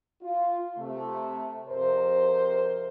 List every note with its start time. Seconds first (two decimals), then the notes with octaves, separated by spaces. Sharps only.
0.21 F4
0.77 C3 A3
1.68 F2 C3 A#4 C5